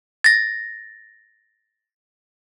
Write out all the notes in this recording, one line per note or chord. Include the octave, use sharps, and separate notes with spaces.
A6 A#6